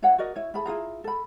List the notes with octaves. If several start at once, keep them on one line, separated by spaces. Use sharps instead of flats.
E4 C#5 F5 F#5
F#4 A#4 D5 D#5
E4 C#5
E4 G#4 A4 B5
E4 F4 G#4 A#5
A4 B5